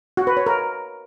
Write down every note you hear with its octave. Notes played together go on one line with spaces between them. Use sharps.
F#4
B4
C#5
A#4